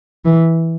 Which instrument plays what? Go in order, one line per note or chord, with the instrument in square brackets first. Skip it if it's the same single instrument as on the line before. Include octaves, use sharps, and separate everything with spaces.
[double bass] E3